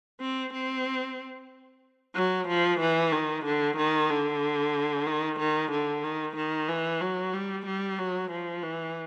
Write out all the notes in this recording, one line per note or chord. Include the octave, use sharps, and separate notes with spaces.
C4
C4
F#3
F3
E3
D#3
D3
D#3
D3
D#3
D#3
D3
D#3
D#3
E3
F#3
G3
G3
F#3
F3
E3